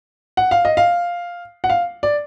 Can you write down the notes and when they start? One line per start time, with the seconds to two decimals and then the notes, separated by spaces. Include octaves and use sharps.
0.37 F#5
0.51 F5
0.65 D#5
0.77 F5
1.64 F#5
1.69 F5
2.03 D5